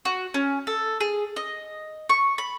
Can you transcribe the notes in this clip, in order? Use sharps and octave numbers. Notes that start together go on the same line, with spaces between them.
F#4
C#4
A4
G#4
D#5
C#6
B5